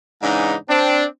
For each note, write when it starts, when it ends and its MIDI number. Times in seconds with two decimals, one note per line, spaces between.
0.23 0.55 44
0.23 0.55 49
0.23 0.55 52
0.23 0.55 62
0.23 0.55 63
0.69 1.04 60
0.69 1.04 62